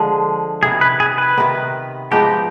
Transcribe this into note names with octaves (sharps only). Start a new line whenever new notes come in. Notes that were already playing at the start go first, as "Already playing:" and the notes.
Already playing: D3 F3 G#3
C3 D#3 B3 G#4
B4
G#4
B4
C3 D#3 B3
G#2 F3 B3 D#4 G4